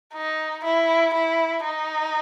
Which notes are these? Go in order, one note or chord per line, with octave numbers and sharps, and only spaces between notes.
D#4
E4
E4
D#4